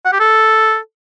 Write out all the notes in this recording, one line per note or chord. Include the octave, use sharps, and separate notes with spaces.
F#5
G4
A4